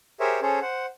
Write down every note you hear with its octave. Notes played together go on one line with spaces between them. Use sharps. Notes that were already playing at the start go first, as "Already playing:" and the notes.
G4 G#4 A#4 C5 C#5 E5
C#4 G#4 A4 C5 C#5
C5 F#5